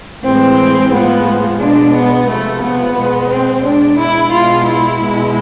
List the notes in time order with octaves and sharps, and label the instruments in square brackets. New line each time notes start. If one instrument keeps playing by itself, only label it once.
[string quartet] A2 E3 G#3 C4
A2 F3 G#3 B3
B2 G#3 D4
B3
C3 F3 G#3 A3
B3
B2 G#3
C4
B2 G#3 D4
E4
B2 G#3 F4
E4
B2 G#3